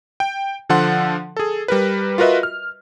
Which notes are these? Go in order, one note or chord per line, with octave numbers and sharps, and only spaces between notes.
G5
D3 F3 A4 F#5 C6
G#4 A4
G3 A#4 B4
F4 F#4 A#4 B4 D#5 E5
F6